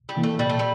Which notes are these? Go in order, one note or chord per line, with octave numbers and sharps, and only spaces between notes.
G3
C3 E3 A#3
A3
A#2 G3
A3
G3